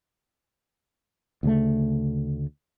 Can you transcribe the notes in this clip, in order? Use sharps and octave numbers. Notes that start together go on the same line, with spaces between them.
D2 C#3 A3